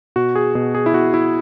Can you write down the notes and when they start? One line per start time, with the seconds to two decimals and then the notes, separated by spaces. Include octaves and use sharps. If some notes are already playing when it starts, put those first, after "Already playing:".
0.16 B2 F#4
0.35 G#4
0.55 B2 G#4
0.75 G#4
0.86 E4
0.94 B2 F#4
1.14 E4